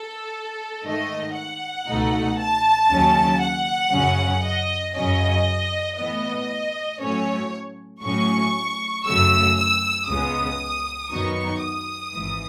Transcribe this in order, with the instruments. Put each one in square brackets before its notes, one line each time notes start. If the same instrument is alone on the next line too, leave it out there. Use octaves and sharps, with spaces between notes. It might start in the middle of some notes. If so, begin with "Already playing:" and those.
Already playing: [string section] A4
G#2 D#3 A3 D#5
F#5
C#2 B2 A3 D#4
A5
D#2 C#3 F#3 C#4
F#5
F#2 C#3 F#3 C#4
D#5
F#2 C#3 F#3 C#4 D#5
A2 E3 B3 D#5
A2 F#3 A3 C#4 C#5
A2 F#3 C#4 C#6
F#2 C#3 F#3 A3 E6
E6
C#2 C#3 G#3 B3 D#6
F#2 D#3 F#3 B3 D#4 C#6
D#6
G#1 G#2 E3